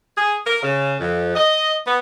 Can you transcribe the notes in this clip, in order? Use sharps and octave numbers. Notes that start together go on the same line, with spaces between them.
G#4
A#4
C#3
F2
D#5
B3